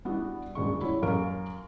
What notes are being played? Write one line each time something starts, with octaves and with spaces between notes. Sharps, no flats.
G3 B3 D4 E4 F#4 G4
F#1 D2 G3 G#3 D4 C#6
E4 F#4 C#5
F#2 A#3 C#6 F6 D7